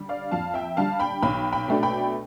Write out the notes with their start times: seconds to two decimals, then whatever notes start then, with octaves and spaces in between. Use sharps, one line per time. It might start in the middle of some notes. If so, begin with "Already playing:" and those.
Already playing: D3 G3
0.09 D5 F5
0.31 F2 F5 A5
0.54 E5 G5
0.77 D3 G3 F5 A5
1.00 G5 B5
1.23 B1 G5 B5
1.52 G5 B5
1.68 B2 A3 D4
1.83 G5 B5